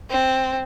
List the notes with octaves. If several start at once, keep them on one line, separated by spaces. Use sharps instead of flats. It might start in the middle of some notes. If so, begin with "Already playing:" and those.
C4